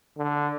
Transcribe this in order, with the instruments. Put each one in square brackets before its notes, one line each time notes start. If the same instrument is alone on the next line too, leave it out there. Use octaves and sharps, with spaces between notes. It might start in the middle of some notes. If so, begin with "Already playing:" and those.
[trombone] D3